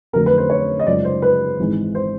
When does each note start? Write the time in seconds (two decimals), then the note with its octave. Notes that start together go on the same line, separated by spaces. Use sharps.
0.13 F2 D3 F#3 A3 A#4
0.26 B4
0.38 C5
0.50 C#5
0.80 D#5
0.86 F#2 C#3 F3 G#3 D5
1.05 C5
1.22 B4
1.59 G#1 G#2 E3 G#3
1.95 C5